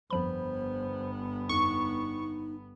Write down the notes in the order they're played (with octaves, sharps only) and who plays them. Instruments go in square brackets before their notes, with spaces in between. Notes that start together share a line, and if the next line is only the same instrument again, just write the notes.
[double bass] G1 B3 [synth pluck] F2 F3 B5 [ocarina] C5
[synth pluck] F2 [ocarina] D#4 [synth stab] C#6